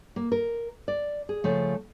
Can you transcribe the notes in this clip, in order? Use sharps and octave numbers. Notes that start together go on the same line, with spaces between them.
A#3
A#4
D5
G#4
C#3 F3 A3